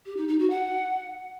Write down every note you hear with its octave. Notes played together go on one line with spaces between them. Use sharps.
G4
D#4
D#4
F#4
F#5